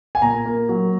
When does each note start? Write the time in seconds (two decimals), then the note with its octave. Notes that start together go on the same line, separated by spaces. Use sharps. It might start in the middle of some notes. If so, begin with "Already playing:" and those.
0.15 G#5
0.22 A#2 A#5
0.46 A#3
0.69 F#3